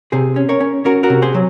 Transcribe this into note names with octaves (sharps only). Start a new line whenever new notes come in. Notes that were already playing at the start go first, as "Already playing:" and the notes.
C3 G#4 C5
C#4
A#4 C#5
C#4
C#4 F#4 A#4
F#4 A#4
C3
G#4 C5
F#3